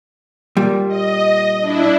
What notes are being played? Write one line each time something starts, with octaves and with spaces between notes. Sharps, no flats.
A#2 G3
D#5
D4 E4